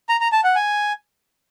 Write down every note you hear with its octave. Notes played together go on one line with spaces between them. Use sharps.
A#5
A#5
A5
F#5
G#5